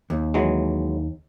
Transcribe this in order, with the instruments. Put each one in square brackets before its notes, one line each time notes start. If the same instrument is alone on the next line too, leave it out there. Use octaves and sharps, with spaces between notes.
[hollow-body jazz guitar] D#2
[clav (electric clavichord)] E3 F#3 G#3